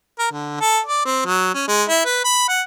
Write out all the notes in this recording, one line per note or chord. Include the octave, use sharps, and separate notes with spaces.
A#4
D3
A4
D5
C4
F#3
C#4
G#3
E4
B4
B5
F#5